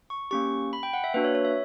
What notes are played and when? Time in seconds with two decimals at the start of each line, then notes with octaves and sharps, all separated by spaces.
0.10 C#6
0.31 A#3 C#4 G4 C#6
0.73 B5
0.83 G5
0.93 F#5
1.04 E5
1.14 A#3 D4 F#4 B4
1.24 C#5
1.35 C#5
1.45 E5